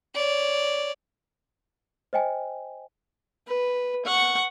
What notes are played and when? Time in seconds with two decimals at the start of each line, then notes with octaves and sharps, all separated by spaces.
0.15 C#5 D5
2.13 C5 D#5 G5 G#5
3.47 B4
4.05 F#5 C#6